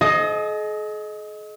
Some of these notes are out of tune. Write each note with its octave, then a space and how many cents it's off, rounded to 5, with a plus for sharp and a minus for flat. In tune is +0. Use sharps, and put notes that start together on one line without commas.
G#4 +45 D#5 +0